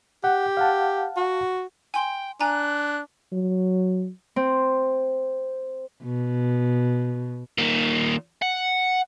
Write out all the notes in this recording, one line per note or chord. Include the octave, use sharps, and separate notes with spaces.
G4 F#5
F5 F#5 A5
F#4
G5 G#5 C6
D4 G#5 A#5 F#6
F#3
C4
B2
A#2 D#3
F#5